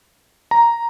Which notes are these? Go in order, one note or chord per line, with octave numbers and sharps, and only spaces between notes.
A#5